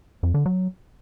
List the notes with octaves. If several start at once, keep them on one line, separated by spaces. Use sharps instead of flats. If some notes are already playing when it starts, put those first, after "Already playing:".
F2
D3
F#3